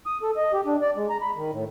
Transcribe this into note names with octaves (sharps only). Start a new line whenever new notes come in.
D#6
A4
D#5
G4
D4
D5
G#3
A#5
B5
D#3
A2